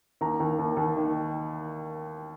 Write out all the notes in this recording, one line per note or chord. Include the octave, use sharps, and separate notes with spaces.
D#2 A#5
D#2
D#2
D#2
D#3